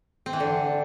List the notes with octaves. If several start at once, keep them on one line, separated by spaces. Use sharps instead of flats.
C4
E3
D3